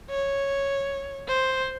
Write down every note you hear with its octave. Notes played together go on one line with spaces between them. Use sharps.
C#5
C5